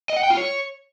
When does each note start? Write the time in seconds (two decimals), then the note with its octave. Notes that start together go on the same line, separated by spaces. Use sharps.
0.10 D#5
0.16 F#5
0.23 G5
0.30 F4
0.37 C#5